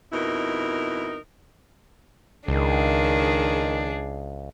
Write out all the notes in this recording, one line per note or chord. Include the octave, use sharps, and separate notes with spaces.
F2 B2 D#4 E4 A#4
C#2 D#3 D4 G#4